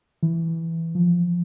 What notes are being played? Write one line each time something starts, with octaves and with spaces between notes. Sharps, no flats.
E3
F3